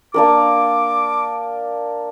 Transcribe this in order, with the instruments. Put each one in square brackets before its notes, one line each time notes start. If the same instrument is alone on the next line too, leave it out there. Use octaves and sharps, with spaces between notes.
[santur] A#3 D4 A#4 [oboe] D6